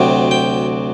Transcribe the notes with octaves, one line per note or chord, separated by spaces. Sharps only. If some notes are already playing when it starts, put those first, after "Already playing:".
Already playing: D2 C3 F#3 C4
G5